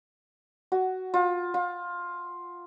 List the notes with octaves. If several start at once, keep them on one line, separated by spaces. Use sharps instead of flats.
F#4
F4
F4